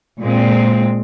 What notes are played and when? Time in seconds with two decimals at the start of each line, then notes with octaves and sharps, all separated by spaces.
0.20 A#2 G#3 C4